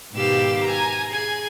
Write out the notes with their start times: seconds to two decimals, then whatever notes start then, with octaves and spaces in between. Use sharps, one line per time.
0.12 G#2 B2 D#3 G4 F5 E6
0.64 G#5 A#5
1.07 G#4 G#5